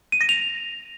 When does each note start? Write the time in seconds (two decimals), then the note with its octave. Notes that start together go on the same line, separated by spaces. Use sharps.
0.12 D#7
0.21 A#6
0.29 F7